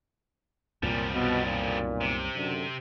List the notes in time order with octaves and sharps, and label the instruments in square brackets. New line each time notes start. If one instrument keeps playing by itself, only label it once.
[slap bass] C2 F#2 [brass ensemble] A#2 [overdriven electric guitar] F3 G3
[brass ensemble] B2
B1 A#2
[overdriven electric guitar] C3
[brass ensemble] F#2 D3